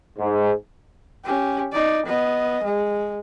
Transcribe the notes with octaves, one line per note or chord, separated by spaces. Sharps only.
G#2
C#4 G4
D#4 D5
B3 D#5
G#3